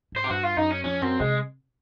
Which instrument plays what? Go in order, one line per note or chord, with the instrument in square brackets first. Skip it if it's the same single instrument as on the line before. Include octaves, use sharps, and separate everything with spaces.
[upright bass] G#2 [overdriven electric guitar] C5
[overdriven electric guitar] G4
[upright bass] G2 [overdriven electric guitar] F#4
[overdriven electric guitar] F4
[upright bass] F#2 [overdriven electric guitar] D#4
[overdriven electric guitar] C#4
[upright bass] F2 [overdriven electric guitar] C#4
[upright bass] F#2 [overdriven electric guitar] C4
[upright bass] C3 [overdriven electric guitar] G#3